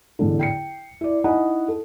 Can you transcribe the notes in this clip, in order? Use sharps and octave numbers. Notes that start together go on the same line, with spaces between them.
A1 E2 D3
G5 C7 C#7
E4 D5
D#4 E4 D#5 F#5 G#5 B5
A4